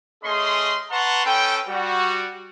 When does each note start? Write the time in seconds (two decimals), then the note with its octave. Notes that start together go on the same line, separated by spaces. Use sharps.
0.24 A3 C#4 G#4 D#5 C6
0.91 B4 F#5 A5 A#5 C6 C#6
1.25 C#4 A4 B4 G5
1.68 G3 F#4